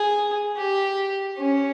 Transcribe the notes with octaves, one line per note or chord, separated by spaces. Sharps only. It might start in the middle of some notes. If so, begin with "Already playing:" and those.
Already playing: G#4
G4
C#4